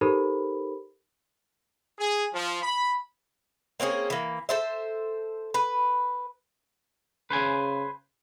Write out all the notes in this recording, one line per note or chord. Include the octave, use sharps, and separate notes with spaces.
D#4 G4 A4 A#4 C5 B5
G#4
F3
B5
A#3 C4 C#4 G#4
E3 A#3
A4 C5 E5
B4
C#3 B4 C5 G#5